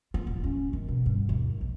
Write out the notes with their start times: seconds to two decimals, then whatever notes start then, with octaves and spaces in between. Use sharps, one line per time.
0.14 F4
0.27 D1
0.44 C#4
0.73 D#3
0.88 B2
1.06 G2
1.29 D#2
1.61 A#1